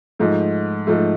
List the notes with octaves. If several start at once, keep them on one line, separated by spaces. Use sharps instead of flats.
G#2 F3 A3
G#2 F3 A3